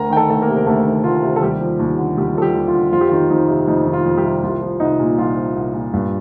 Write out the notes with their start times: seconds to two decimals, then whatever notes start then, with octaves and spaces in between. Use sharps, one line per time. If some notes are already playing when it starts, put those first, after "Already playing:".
Already playing: D2 A#4 A#5
0.10 D#3 G5
0.16 A4 A5
0.30 D2 A4
0.42 A#3 A#4
0.48 C3
0.57 A#4
0.66 D2 A3 A4
0.85 D#3
1.04 D2 F4
1.22 C3
1.36 A4
1.41 D#2 G3 G4
1.60 F3
1.79 D#2
1.98 D3
2.17 D#2 G3 G4
2.35 F3 A4
2.42 G3 G4
2.55 D#2
2.68 F4
2.73 D3
2.92 F2 F4
3.01 G4
3.09 D#3 F4
3.30 F2 D#4
3.48 C3
3.68 F2 D#4
3.86 D#3
3.93 F4
4.05 F2
4.17 G3 G4
4.24 C3
4.43 C2 F4
4.61 F3
4.80 C2 D#4
5.00 A#2
5.18 C2 F4
5.37 F3
5.56 C2
5.74 A#2
5.93 G2